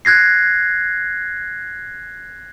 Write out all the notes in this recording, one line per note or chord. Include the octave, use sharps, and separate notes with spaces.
F#6 G#6 A#6 C7